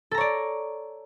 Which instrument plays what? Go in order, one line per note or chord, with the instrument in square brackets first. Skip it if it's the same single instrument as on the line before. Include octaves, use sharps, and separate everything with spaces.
[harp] A4
A#5
C#5
D5